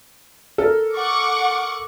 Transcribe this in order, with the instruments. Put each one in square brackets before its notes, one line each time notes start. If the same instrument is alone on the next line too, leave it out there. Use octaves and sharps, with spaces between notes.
[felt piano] A4 A#4
[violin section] F#5 C#6 D6